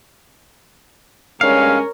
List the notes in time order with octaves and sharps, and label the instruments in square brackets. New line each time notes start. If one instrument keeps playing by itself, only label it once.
[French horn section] G2 G#3 C#4 [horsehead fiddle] A#4 C#5 [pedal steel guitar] F5